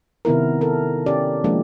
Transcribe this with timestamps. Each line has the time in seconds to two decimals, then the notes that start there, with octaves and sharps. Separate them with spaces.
0.25 C3 D#3 B3 E4 A#4
0.61 A4 A#4
1.06 C#4 G4 D5
1.44 F3 G#3 A#3 D4